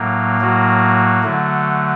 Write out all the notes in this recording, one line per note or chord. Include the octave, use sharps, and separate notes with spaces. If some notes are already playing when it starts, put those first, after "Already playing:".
Already playing: A2 F#3 A#3
F#3 F#4
D3 F#3 A3